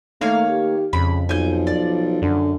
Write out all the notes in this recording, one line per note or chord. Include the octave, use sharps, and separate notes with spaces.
D#3 A3 A#3 C#5 F5
G4
F2 C#3 B5
B1 F3 G#5 G6
D5
F#2 D3